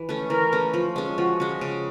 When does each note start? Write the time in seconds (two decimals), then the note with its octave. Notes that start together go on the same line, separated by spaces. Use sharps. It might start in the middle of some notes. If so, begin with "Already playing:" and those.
Already playing: E3
0.09 A3 C#4
0.30 E3 A#4
0.53 A3 C#4
0.74 F3
0.96 G#3 C#4
1.18 F3 F#4
1.40 G#3 C#4
1.61 C#3